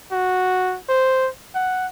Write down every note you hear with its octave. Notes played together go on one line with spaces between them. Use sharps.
F#4
C5
F#5